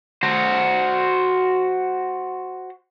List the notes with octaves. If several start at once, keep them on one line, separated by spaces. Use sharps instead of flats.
F#4 C5